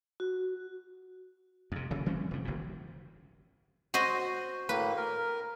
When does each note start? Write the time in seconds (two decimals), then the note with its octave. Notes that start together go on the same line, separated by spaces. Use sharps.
0.20 F#4
1.72 F2 C3
1.91 F#1 C#3 E3
2.06 E3 G3 C4 C#4
2.31 F1 A2
2.45 F#1 G#2
3.94 F#4 C5 D#5
4.69 A2 A#3 B4
4.97 A#4